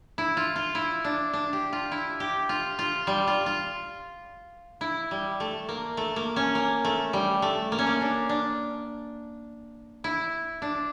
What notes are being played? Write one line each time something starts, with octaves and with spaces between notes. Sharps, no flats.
E4
F4
F4
E4
D4
D4
G4
F4
E4
G4
F4
F4
G3
F4
F4
E4
G3
A3
A#3
A3
A#3
C#4
A#3
A3
G3
A3
A#3
C#4
A#3
D4
D4
E4
D4